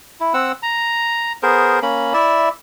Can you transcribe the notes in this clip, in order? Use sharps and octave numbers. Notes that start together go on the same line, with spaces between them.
E4
C4 F#5 E6
A#5
B3 G#4 A#4 C5
A#3 C#4 B5
E4 D5 E5